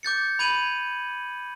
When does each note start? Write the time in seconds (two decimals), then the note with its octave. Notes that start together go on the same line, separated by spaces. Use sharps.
0.03 D6 G6 A6 C#7
0.39 B5 G#6 D#7 F#7